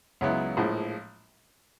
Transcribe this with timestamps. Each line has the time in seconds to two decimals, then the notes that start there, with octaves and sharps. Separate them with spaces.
0.21 C#2 C#3 F#3 B3 E4
0.57 A#1 A2 F3 G#3